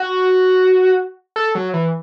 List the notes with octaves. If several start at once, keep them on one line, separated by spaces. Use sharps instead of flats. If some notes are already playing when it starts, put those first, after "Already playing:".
Already playing: F#4
A4
F#3
E3